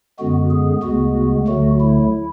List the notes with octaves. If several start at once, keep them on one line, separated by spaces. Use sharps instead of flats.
F#2 D3 G#3 B3 F#4
G#4
D2 C#3 G#3 B3 F#4
D2 D3 F#3 A3 F#4
E4